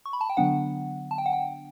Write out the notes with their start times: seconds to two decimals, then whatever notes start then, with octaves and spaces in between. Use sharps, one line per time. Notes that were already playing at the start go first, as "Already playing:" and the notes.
0.06 C#6
0.13 B5
0.21 A5
0.29 G5
0.37 D3 F#3 B3 D4 F#5
1.11 A5
1.18 G5
1.26 F#5
1.33 G5